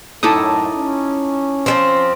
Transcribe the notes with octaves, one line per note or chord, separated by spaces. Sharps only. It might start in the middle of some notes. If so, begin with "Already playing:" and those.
F#2 A2 D#4 E4 A4 A5 D6 D#6
C#4
F3 G3 C4